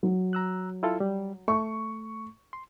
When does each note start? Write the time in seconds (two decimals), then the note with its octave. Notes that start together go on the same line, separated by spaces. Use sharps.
0.03 F#3
0.33 A#5 E6 F#6
0.83 E4 F4 A4
1.00 G3
1.48 A3 C#6
2.53 C6